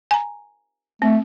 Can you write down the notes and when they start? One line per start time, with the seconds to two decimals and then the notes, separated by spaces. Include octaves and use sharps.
0.11 G#5 A#5
1.02 A3 C4